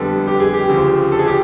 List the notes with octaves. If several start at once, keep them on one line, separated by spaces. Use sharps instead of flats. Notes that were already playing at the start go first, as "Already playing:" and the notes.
Already playing: F2 D3 G3 B3 A4
G4
G#4
G4
D2 C#3 F3
A4
G#4
G4